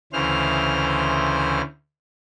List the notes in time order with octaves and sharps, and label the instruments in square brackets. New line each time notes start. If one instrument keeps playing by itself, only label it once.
[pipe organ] D2 C#3 E3 C5 F6